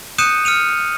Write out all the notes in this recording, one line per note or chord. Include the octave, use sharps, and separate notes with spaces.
D#6 F#6 G6 C#7 D#7 E7
F6 C#7 D#7 F7